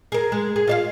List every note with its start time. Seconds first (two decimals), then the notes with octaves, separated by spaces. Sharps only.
0.12 G#4 A#4
0.32 G#3
0.56 G#4
0.67 F4 D5 F5